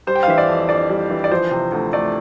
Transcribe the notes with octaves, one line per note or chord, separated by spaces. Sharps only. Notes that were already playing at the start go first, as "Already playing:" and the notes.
G3 C5
G5
F5
E3 E5
D5
F2
F2 D5
G3
E3
D5
F3 C5
C3
D2
A3 D5